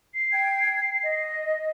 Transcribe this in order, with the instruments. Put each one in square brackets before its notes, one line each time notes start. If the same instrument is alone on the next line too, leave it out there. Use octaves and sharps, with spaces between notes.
[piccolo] C7
[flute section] G5 G#6
D#5